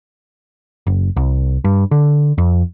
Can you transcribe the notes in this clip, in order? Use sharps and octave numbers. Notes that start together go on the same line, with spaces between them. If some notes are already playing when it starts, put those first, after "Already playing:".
F#1
C2
G2
D3
F2